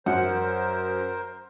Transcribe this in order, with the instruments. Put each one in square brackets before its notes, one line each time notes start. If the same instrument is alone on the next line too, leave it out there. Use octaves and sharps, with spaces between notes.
[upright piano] F#2 [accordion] A#4 C5 [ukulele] F#5